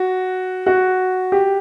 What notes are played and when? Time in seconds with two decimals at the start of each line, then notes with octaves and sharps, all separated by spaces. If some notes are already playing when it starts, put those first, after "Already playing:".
Already playing: F#4
0.66 F#4
1.32 G4